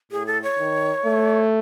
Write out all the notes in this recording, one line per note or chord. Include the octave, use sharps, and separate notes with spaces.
A2 G#4
A4
C#5
D#3
A3